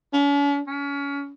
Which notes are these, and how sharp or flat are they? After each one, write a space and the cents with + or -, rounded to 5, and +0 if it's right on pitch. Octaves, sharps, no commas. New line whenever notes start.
C#4 +45
C#4 +30